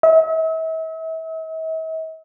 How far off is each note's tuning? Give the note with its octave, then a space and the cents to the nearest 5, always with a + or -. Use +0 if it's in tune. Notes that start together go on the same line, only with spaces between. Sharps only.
E5 -45